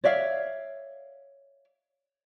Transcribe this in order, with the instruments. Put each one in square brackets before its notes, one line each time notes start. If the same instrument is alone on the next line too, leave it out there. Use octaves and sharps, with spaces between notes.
[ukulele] C#5 D5 E5 F5